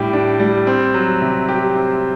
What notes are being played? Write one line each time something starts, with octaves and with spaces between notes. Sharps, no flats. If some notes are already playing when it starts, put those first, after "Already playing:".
Already playing: A2 G3 D4 G4
D4
G3
C4
F#3
C3
G4
C4